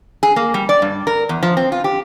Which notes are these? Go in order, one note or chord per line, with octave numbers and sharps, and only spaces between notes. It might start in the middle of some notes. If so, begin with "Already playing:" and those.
G#4
A#3
G3
D5
G2
A#4
E2
F3
C4
F4
G4